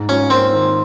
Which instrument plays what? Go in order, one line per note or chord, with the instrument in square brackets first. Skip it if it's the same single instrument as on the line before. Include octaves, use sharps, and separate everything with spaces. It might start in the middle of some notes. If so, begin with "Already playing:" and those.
Already playing: [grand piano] G#2
[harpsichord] C#4 [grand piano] F4
[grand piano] A#3 [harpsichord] C4
[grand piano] D#3